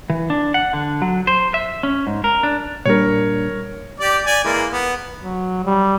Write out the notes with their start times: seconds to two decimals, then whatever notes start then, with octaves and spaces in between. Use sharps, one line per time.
0.10 E3
0.30 D4
0.54 F#5
0.73 D3
1.02 F#3
1.27 C5
1.54 E5
1.83 C#4
2.07 G#2
2.24 A#4
2.43 D4
2.85 A#2 G3 D4 A#4 C#5
4.00 G4 D5 D6
4.26 D5 G#5
4.44 E3 G#3 A#3
4.72 B3
5.23 F#3
5.65 G3